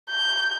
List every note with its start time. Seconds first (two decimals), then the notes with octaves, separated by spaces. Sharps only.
0.10 G6